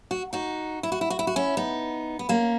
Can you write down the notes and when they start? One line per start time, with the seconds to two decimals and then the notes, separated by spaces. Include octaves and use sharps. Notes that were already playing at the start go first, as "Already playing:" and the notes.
0.11 F#4
0.33 D#4 F#4
0.83 E4
0.92 F#4
1.01 E4
1.10 F#4
1.19 E4
1.27 F#4
1.36 C#4 E4
1.57 B3 D#4
2.19 B3
2.29 A#3 C#4